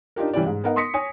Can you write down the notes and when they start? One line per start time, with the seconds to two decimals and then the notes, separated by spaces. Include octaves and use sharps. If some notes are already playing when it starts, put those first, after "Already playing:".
0.16 D4 D#4 F4 G4 A#4
0.33 E3 G3 C#4 E4 G4 D5
0.46 G#2
0.64 B3 D#4 A#4 D#5 F#5
0.76 C6 D#6 A#6 B6 C#7
0.94 C#5 G#5 D#6